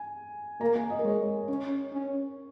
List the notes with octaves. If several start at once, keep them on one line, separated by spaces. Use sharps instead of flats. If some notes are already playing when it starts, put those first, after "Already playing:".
Already playing: G#5
A#3 A#5
G#5
D#5
A#4
G#3 C#5
C#4 C#5
C#4